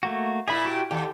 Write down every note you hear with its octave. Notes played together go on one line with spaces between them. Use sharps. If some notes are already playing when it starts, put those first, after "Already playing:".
A3 A#3 F#4
A#2 E4 G#4 E5 B5
F#4 G4 G5
D#2 G4 A4